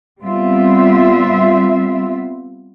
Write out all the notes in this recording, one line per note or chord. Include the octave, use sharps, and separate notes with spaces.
G3 B3 C4 F4 E5